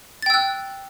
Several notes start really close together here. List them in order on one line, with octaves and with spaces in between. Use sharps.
A6 G5 E6 F#6